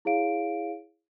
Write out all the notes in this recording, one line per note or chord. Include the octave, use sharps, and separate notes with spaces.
E4 G#4 C#5 F5 D7